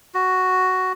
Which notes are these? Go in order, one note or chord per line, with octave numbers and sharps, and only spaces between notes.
F#4